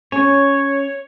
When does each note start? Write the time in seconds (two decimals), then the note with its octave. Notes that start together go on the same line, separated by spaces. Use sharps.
0.12 C#4 C#5